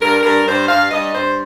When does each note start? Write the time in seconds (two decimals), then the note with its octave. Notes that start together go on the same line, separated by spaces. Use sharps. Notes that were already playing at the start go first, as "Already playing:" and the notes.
0.01 G2 A#4
0.23 G2 A#4
0.46 G2 C5
0.69 G2 F5
0.91 G2 D#5
1.14 G2 C5